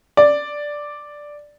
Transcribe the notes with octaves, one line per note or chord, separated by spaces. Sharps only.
D5